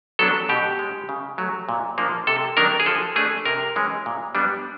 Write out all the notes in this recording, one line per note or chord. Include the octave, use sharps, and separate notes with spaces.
F#3 B3 D4 A4
B2 G4
G#3 C#4
C#3
F#3 A3
A#2
F3 A#3 D4
C3 A4
D#3 F#3 A#3 D4 A#4
G#4
F3 A4
A3 D4 G#4
C3 A#4
E3 G#3 C#4
A#2
G3 B3 D4